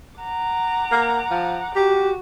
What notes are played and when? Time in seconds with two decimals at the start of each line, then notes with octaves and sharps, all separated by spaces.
0.21 F#5 A#5 D6
0.92 A#3
1.31 F3
1.76 F#4 G4